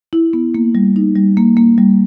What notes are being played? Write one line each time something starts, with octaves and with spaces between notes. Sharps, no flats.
E4
B3
A#3
G3
D#4
G3
A#3
A#3
G3